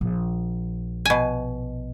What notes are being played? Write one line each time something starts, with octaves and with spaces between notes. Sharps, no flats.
A#1
B2 G#5